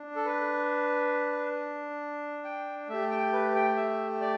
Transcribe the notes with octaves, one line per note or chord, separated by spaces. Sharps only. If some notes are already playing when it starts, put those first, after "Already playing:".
Already playing: D4
A4
B4
G5
A3 G4 E5
G5
B4
G5
E5
D5